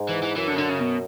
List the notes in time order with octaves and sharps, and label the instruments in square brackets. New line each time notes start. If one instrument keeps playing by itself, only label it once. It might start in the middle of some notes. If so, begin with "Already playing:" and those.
Already playing: [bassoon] G#2
[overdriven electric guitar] E3
E3
[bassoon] F#2 [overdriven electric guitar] E3
[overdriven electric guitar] D3
C#3
D3
C#3
B2